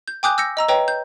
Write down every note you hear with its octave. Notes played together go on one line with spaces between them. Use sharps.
G6
G5 G#5 D6 D#6 F#6 G6
E6 G6 A#6 C#7
D#5 A#5 E6
B4 C#5 D#5 G5 A#5
G6